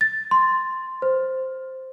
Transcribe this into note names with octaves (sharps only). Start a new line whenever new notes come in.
A6
C6
C5